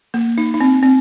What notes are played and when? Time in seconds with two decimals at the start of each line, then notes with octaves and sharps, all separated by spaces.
0.14 A#3
0.38 D#4
0.54 D#4
0.61 C4
0.83 C4